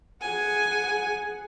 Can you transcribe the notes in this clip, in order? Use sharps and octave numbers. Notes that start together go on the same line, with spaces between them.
G#4 F#5 G#5